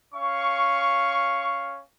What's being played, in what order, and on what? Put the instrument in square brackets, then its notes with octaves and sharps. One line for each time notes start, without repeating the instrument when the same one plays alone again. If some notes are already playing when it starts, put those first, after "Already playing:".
[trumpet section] C#4 F5 C#6